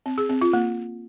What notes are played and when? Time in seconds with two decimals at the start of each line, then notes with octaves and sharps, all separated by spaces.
0.06 C4
0.18 G#4
0.30 C4
0.42 F4
0.53 A#3